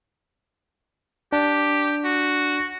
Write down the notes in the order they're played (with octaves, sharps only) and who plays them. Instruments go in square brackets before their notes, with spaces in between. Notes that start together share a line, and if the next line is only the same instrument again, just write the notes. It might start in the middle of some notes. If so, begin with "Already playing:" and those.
[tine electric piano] D4 [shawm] G4
[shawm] F#4